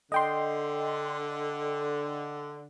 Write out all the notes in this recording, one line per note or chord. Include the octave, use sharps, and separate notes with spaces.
D3 D#5 G5 C6